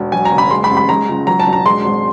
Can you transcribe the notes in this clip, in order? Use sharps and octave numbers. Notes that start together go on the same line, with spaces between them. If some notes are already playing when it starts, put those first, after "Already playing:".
Already playing: E1
F#3 G#5
A#5
F#1
B5
G#3 C6
B5
A1
B5
G#3 A#5
C#2
F#3 A#5
A5
E1
A#5
G#3 C6
G#1